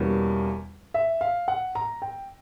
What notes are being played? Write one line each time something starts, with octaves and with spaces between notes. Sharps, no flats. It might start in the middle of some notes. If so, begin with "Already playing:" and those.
Already playing: E2 B2 G3 A#3 C#4
E5
F5
F#5
A#5
G5